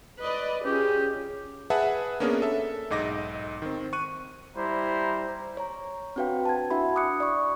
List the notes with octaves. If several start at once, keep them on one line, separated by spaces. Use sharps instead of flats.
B4 D5 D#5
C#4 F4 G4 G#4
G#4 B4 E5 F#5 A5
A#3 B3 C#4 D4 G#4 A#4
A4 E5
B1 G#2 D#5 D6 A#6
D#3 C4
C#6 F#6 D#7
G3 E4 C5 A#5
C#5 A#5
C4 D4 F#4 B4 F5 G5
A5 G#6
D4 E4 F#4 E5 F#5 B5
G#5 D6 D#6 F#6 C#7
D5 B5 C#6